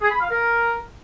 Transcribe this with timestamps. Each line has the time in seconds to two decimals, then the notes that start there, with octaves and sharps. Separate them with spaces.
0.01 G#4
0.11 B5
0.20 F5
0.30 A#4